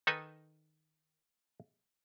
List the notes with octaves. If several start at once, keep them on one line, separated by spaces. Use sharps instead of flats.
D#3 D#4 A4 B4 G#5